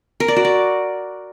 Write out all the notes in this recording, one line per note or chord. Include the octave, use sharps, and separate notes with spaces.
A#4
D5
F#4
D5